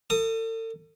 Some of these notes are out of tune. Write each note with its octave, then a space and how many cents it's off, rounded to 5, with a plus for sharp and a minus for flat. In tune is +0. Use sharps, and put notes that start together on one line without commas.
A4 +40 D#6 +0